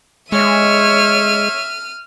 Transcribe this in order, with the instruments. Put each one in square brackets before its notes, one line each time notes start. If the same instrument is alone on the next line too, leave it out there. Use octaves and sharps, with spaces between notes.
[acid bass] G#3 [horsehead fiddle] C#5 [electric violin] E5 [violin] F6 D#7